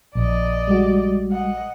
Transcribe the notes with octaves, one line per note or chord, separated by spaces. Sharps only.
A#1 D5 D#5
G3 G#3 F#4
D#5 F#5